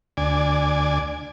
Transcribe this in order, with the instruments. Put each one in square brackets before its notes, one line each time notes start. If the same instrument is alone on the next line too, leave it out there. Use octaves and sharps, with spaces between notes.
[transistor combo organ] D2 D5 G#5